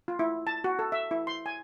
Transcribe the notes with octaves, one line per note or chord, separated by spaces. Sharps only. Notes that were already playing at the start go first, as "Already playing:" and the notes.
F4
E4
A5
F#4
A4
E5
E4
C6
G#5